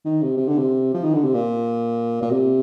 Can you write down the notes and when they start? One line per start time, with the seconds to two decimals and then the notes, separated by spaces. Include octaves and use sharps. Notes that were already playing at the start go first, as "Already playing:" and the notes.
0.05 D#3
0.22 C3
0.37 C3
0.48 D3
0.58 C3
0.94 F3
1.04 D#3
1.14 D3
1.24 C3
1.34 A#2
2.22 A#2
2.31 C3